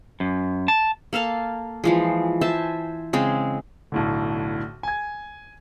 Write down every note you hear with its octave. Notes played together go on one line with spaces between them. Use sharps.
F#2
A5
A#3 A4 F5 A5
E3 F3 G#3
C5 E5 G#5 A5
C#3 G#3 C4
B1 A2 D3
G#5 G#6